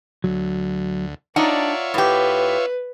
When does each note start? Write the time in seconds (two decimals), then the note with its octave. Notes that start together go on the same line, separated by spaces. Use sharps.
0.24 D2 F#3
1.36 D4 D#4 F4 C#5 D5 E5 F#5 A#5
1.94 A2 G4 B4